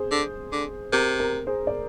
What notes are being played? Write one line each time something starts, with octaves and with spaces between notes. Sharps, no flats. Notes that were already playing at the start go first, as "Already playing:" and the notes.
Already playing: G#4 C5
D3
D3
C3 A#4
A#4
G#4 C5
D5